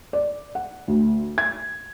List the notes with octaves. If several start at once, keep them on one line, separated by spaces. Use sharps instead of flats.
D5
F#5
D2
G#6